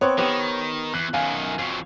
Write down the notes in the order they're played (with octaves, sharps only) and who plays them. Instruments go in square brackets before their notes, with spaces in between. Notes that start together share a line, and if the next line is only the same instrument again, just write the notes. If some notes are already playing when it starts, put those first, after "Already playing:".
[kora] B3 C4 [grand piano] C#5
[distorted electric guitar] D#3 [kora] B3 G4
[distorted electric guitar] E2 [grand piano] F#6
[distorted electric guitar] F#2 D#3 [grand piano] F5 G#5
[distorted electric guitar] F2 F#3 [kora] F5